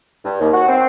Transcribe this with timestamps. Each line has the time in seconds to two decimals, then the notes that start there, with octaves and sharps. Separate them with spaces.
0.24 G2
0.41 D#2
0.54 F#4
0.68 C4